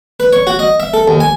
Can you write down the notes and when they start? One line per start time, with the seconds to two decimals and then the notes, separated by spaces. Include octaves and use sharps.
0.20 B4
0.33 C#5
0.47 F#4
0.59 D#5
0.80 E5
0.94 A4
1.08 D#2
1.20 G#5